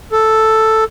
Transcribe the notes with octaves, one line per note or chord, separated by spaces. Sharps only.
A4